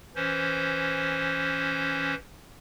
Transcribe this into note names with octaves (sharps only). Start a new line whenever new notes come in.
E3 C#4 C5